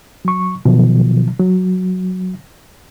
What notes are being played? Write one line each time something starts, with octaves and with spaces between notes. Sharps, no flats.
F#3 C#6
B2 D#3 F3 F#3
F#3